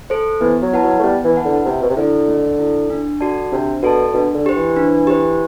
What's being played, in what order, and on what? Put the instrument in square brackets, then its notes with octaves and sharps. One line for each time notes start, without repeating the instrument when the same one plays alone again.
[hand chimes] A4 C5
[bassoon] E3 [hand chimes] B3
[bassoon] F#3
[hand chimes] E4 B4 F#5 A5
[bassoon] F#3
A3
[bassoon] G3 [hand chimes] B3
[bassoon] E3
[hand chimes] E4 B4 F#5 A5
[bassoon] D3
[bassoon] C3 [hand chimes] A3
[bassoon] B2
C3
[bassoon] D3 [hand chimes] E4 A4
[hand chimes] A3
E4 A4
D4
F#4 A4 D5 A5
[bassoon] C3 [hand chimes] D4
[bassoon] B2 [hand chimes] F#4 A4 D5 A5
[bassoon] B2 [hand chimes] D4
[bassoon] D3
[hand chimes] G4 C5
[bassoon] E3
[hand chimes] D4
G4 C5